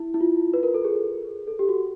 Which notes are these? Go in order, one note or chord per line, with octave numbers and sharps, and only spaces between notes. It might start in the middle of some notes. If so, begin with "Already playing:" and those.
Already playing: E4
E4
F4
B4
A#4
A4
G#4
A4
G4
F#4